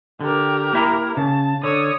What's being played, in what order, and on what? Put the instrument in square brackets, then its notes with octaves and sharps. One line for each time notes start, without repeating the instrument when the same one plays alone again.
[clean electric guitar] D3 [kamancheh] G4 A#4
[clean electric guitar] A#3 E4 A#5
[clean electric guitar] C#3 [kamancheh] A5
[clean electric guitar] D3 [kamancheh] C#5 D#6